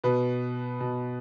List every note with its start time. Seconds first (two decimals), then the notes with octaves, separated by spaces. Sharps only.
0.04 B2 B4
0.80 B2